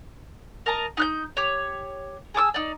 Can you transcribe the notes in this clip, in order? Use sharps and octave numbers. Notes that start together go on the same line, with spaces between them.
A#4 D#5 A5 A#5
D#4 F#6 G6
G4 C#5
G#4 A5 D6 E6
D#4 D5